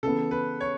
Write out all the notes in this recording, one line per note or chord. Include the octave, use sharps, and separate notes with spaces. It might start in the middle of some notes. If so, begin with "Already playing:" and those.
C#3 E3 B3 A4
B4
C#5